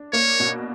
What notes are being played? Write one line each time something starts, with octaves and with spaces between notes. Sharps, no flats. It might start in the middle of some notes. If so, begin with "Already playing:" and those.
Already playing: D4
A#3 C#5
B2